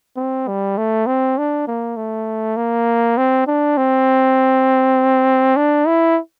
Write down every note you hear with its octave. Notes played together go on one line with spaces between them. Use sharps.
C4
G3
A3
C4
D4
A#3
A3
A#3
C4
D4
C4
D4
E4